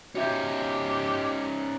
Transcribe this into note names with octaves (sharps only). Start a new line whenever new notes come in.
F3 C#4 D#4 F#4 G4 E5 G6